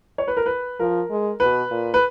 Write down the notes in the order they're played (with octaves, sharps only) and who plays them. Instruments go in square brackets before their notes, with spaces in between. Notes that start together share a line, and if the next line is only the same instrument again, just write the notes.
[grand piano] C#5
B4
A#4
B4
[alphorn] F3 [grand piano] A#4
[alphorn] G#3
[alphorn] B2 [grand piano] B4
[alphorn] A#2
[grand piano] B4